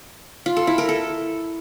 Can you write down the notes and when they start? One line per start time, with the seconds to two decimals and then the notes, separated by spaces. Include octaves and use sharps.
0.46 F4
0.57 A4
0.67 E4
0.78 A#4
0.89 A4